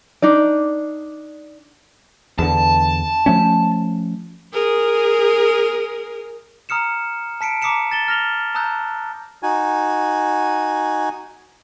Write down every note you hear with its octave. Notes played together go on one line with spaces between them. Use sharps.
D4 D#4 D5
E2 D3 A5
F3 A3 C#4
G#4 A#4
A#5 D#6 F6 C#7 E7
A5 B6 C#7 D7
A#5 D6 D#6 B6 C#7 E7
A6 E7 G7
F6 A#6 F7 G7
A5 A#5 D#6 E6 F#6 G6
D#4 F#4 G#5